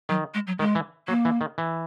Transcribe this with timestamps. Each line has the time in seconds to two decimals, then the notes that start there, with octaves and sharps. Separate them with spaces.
0.09 D#3 F#3
0.34 G#3
0.47 F#3
0.59 D#3 G#3
0.75 E3
1.08 F#3 A#3
1.25 E3
1.41 D#3
1.58 E3